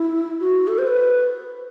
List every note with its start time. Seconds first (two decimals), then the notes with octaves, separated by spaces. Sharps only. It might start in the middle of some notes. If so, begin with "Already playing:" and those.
Already playing: E4
0.40 F#4
0.68 A4
0.78 C5
0.87 B4